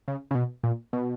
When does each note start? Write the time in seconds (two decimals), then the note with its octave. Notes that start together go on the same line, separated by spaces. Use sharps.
0.08 C#3
0.31 C#3
0.35 B2
0.64 A#2
0.93 B2